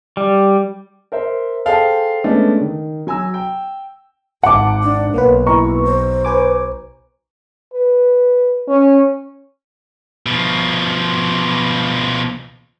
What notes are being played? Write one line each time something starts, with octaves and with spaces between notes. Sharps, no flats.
G3
A#4 C5 E5
G#4 A4 C5 F5 G5 A5
G#3 A3 B3 C#4 D4
D#3
F#3 G#5 A#5 E6
G5
G#1 F#5 A5 D6
D4
B1 A#3 B4 C#5
E4 A#5 C#6
C5
B4 G#5 D6
B4
C#4
B2 F3